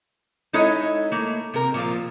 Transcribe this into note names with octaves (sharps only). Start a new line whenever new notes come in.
G#3 D#4 E4 A4 C#5 D#5
A3 A#3
C3 A#4
A#2 F3 F5